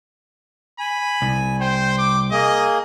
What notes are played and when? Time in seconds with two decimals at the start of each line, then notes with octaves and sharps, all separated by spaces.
0.79 G#5 B5
1.22 C2
1.60 C5 G5
1.98 D6
2.32 A#3 G#4 D#5